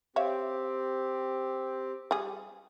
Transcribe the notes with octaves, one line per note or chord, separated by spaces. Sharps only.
C4 G4 C#5 E5 F5
G3 G#4